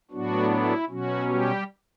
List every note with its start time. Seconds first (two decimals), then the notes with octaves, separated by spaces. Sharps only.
0.11 A2 F#3 B3 D4 F#4
0.50 E4
0.89 B2 F#3 C#4 F#4
1.28 G3 G4